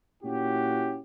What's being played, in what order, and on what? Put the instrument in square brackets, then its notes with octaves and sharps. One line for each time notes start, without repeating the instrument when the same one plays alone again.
[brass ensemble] A#2 C#4 E4 F#4 G4